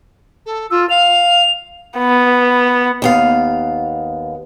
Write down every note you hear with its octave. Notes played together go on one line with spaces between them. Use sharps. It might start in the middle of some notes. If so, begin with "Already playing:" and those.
A4
F4 E6
F5 F7
B3
D#2 B3 F5